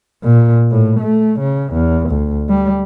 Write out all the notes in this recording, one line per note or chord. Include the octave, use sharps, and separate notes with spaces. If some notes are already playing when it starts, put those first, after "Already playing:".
A#2
A2
A3
C#3
E2
D2
G3